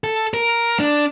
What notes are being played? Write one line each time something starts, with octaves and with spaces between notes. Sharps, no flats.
A4
A#4
D4